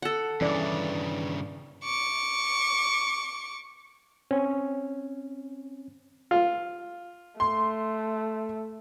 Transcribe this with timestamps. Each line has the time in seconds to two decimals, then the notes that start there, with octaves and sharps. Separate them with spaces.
0.02 A4 F#5
0.41 G2 C#3 E3 C#4 D5
1.84 C#6 D6
4.31 C4 C#4
6.31 F4
7.40 A3 C6